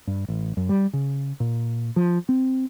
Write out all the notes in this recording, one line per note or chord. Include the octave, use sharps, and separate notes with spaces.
G2
A1
F#2
G3
C#3
A#2
F3
C4